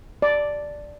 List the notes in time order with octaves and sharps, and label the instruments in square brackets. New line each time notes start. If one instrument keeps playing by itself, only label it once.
[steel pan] D5